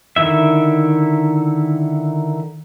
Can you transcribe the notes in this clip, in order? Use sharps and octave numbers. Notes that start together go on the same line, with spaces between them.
D3 D#3 G3 E4 E5